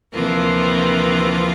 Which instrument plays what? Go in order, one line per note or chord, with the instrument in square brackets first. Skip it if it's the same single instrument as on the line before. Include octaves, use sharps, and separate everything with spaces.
[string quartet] D2 C3 E3 F3 A#3 F4